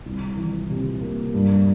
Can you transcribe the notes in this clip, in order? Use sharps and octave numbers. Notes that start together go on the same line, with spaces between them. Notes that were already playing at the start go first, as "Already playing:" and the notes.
C2
E3
C3
A#3
G2